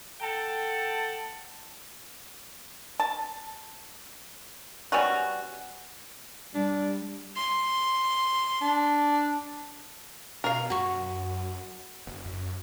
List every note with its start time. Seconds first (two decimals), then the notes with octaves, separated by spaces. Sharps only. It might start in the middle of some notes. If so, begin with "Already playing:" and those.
0.21 A4 F#5 G5 A5
3.00 A5
4.92 G3 B3 C#4 F#4
6.54 G3 D4
7.36 C6
8.61 D4
10.44 B2 A#4 F5
10.70 F#2 F#4 C#6
12.07 F#1
12.25 F#2